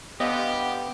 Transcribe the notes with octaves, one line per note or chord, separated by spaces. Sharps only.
D3 G3 B3 G4 D#5 F5